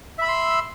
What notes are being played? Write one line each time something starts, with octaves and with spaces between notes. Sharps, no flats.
E5 B5 C6 E6